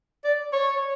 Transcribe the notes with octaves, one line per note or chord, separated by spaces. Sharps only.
D5
C#5